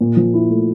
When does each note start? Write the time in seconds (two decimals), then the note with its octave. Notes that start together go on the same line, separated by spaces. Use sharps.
0.01 A#2
0.17 F3
0.34 E4
0.50 A3